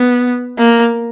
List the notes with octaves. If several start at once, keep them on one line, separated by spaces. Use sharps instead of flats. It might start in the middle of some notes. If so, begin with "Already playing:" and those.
Already playing: B3
A#3